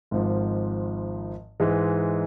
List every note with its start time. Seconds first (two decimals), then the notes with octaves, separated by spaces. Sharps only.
0.11 G#1 G#2 F3
1.60 G#2 E3 G#3